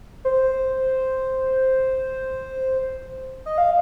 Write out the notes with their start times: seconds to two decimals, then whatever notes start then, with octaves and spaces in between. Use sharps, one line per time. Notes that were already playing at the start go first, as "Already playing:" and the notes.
0.25 C5
3.46 D#5
3.58 F5